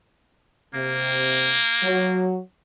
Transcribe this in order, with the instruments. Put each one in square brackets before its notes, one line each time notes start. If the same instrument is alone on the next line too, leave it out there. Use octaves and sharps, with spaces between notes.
[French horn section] C3 [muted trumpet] A#3
[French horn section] F#3